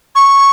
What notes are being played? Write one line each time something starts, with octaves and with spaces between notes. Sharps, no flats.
C#6